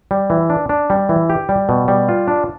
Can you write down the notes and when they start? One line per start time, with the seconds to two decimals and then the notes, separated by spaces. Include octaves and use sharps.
0.11 G3
0.30 E3
0.50 D4
0.69 D4
0.90 G3
1.09 E3
1.30 G4
1.49 G3
1.69 B2
1.88 G3
2.09 F4
2.28 D4